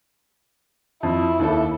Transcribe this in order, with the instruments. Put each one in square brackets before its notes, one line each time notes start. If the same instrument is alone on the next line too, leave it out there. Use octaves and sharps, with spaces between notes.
[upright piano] F2 [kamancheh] E4
[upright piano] D#2 E3 A4